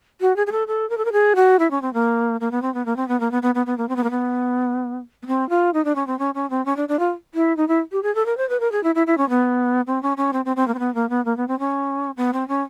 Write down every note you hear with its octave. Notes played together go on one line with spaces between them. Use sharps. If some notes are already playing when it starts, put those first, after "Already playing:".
F#4
G#4
G#4
A4
A4
A#4
A4
A#4
G#4
F#4
E4
C#4
C4
A#3
A#3
B3
C4
B3
A#3
C4
B3
A#3
B3
B3
B3
B3
A#3
C4
B3
A#3
B3
B3
C4
F4
D#4
D4
C#4
C4
C#4
C#4
C4
C#4
D4
D4
F4
E4
D#4
E4
G4
G#4
A4
A#4
C5
B4
A#4
G#4
E4
E4
E4
C#4
B3
C4
C#4
C#4
C4
C4
C4
A#3
C4
B3
A#3
B3
A#3
B3
C4
C#4
B3
C4
C#4